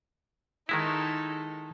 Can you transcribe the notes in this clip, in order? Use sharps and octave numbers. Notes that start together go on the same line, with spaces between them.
D#3 G#3 D#4 E4 A4